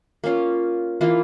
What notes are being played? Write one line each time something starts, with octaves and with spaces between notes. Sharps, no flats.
A#3 C#4 F4
E3 A#3 F4